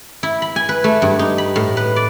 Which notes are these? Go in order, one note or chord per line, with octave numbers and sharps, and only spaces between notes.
E4
B5
G#5
B4
A3
G2
D#4
B5
A2
B4
D5